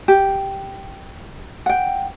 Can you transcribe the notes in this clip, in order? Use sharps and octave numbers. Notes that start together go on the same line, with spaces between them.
G4
F#5 G5